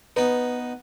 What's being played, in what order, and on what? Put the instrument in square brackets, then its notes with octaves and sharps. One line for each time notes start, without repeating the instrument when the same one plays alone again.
[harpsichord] B3 D#4 [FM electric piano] B4